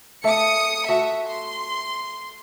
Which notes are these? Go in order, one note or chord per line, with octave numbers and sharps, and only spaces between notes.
A3 E5 F5 D#6 C#7
A3 F#4 E5
C6